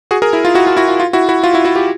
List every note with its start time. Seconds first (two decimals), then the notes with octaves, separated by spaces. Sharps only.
0.11 F#4 G#4
0.22 G#4 A#4
0.33 E4
0.45 F4
0.55 E4 F#4
0.67 F4
0.77 E4 F#4
0.88 F4
1.00 F4
1.13 E4 F#4
1.29 E4 F#4
1.44 F4
1.54 E4 F#4
1.65 E4 F#4
1.76 F4 G4